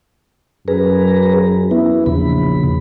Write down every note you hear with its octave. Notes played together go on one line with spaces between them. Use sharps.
F#2 G#4 B4 A#5
B3 E4
A#1 E2 C#3 B5